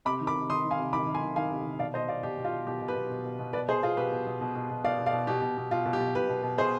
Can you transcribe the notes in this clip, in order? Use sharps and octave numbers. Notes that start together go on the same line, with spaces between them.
C3 B5 D6
D#3
B5 D6
C3
D#3 C6 D#6
D#3
F5 G#5
C3
D#3 B5 D6
D#3
G#5 C6
D#3
D#3 F5 G#5
C3
D#3
B2 D5 F5
B2 C5 D#5
B2 D5 F5
B2 G4
B2
F4
B2
B2 G4
B2
G4 B4
B2
B2
B2
B2
B2 B4 D5
B2 G#4 C5
B2 F4 G#4
B2 G4 B4
B2
B2
B2
B2
B2
B2 D5 F5
B2
D5 F5
B2
B2 G4
B2
B2
B2 F4
B2
G4
B2
B2 G4 B4
B2
B2
B2 G#4 C5